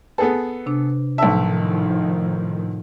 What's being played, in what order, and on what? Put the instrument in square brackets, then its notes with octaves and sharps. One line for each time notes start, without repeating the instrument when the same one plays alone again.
[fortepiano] B3 G#4 A4 [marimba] B4
[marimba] C3 D4
[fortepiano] B1 E5 [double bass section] A2 D#3 F3 [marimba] A5